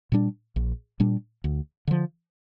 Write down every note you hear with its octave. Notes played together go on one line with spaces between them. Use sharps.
A#2 G3 D4
A#1
A#2 G3 D4
D2
D3 F3